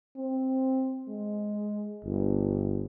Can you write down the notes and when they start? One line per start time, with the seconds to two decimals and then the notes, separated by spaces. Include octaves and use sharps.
0.17 C4
1.09 G#3
2.05 G1